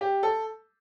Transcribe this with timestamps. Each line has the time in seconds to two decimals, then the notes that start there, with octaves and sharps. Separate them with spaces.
0.01 G4
0.23 A4